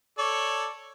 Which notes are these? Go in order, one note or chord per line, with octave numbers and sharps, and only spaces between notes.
A4 C#5 D5